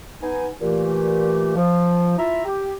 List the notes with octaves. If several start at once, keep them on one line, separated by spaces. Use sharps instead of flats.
B3 D#4 G#5
A#2 E3 A3 G4
F3
E4 F4 E5 A#5
G4